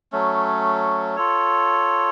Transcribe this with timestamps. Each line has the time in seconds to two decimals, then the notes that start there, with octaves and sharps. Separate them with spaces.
0.12 F#3 A3 C#4
1.16 F4 A4 C#5